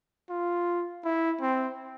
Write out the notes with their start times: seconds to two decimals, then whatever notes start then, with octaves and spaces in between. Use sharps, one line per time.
0.30 F4
1.05 E4
1.42 C4